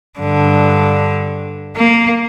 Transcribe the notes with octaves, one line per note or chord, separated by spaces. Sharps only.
G2 D3
A#3